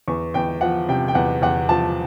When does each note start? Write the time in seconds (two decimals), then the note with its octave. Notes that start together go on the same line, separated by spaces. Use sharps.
0.08 E2 C#6
0.34 E2 G5
0.61 F3 F#5
0.89 C3 G5
1.08 G5
1.15 E2 F#5
1.42 E2 F#5
1.69 F3 A5